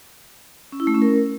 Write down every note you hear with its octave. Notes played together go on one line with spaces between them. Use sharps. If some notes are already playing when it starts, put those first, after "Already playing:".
C#4
E4
A3
C#4
A#4